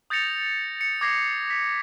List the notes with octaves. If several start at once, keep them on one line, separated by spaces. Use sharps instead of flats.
D#6 G6 A6 A#6 C#7 F7
C#7
D6 G#6 A#6 C7
B6